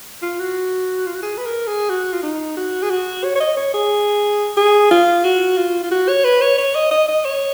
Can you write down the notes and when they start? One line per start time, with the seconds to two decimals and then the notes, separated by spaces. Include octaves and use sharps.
0.22 F4
0.39 F#4
1.07 F4
1.15 F#4
1.22 G#4
1.38 B4
1.45 A#4
1.67 G#4
1.90 F#4
2.13 F4
2.23 D#4
2.57 F#4
2.83 G#4
2.90 F#4
3.24 C#5
3.35 C#5
3.40 D#5
3.57 C#5
3.74 G#4
4.57 G#4
4.91 F4
5.24 F#4
5.57 F4
5.83 F4
5.91 F#4
6.08 C#5
6.24 B4
6.41 C#5
6.58 C#5
6.75 D#5
6.91 D#5
7.08 D#5
7.25 C#5